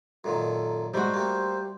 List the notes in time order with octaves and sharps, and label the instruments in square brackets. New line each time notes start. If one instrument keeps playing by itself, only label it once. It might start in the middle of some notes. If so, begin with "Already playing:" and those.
[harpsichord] F#2 A#2 D#3 [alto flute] A4
[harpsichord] G#2 A3 [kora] G3 F#4 [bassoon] C5
[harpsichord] A3 A#3 [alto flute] G4